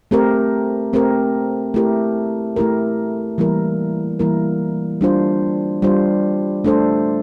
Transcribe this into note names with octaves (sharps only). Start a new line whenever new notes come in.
A3 C4 G4 A#4
A3 C4 G4 A#4
A3 E4 G4 A#4
A3 E4 G4 A#4
E3 G3 A#3 E4 A#4
E3 G3 A#3 E4 A#4
G3 D4 F4 C5
G3 D4 F4 C5
A3 D4 A4 C5